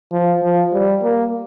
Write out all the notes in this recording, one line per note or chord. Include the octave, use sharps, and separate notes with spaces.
F3
F3
G3
A#3